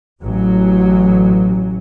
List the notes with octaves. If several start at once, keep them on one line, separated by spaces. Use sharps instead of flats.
A1 F#3